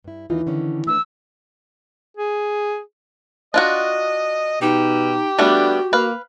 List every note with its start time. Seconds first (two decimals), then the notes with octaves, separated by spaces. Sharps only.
0.04 G2 E4
0.30 D#2 E3 D#4 F4
0.47 D3 D#3 C#4
0.87 A3 D4 B4 E6
2.17 G#4
3.54 D4 F4 F#4 D#5
4.62 B2 D#4 G4
5.39 G3 A3 B3 D4 F#4
5.93 A#3 B4 F5